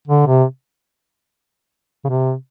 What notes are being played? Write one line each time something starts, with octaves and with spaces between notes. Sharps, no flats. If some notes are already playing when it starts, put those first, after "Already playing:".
D3
C3
C#3
C3